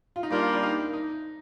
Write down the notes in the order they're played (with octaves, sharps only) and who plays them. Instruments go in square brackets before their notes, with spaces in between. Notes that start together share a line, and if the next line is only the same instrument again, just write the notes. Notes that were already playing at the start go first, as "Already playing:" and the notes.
[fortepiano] F4
D#4
[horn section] G3 A#3 F4 [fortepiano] D4
[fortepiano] D4
D#4
D#4